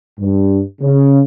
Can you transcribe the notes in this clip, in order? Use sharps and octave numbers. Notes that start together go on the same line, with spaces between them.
G2
C#3